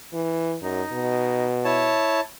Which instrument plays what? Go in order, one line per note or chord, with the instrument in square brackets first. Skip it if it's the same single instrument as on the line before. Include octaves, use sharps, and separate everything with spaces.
[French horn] E3
[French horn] F#2 [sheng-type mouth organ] D#4
[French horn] B2
[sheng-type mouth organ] E4 C#5 A5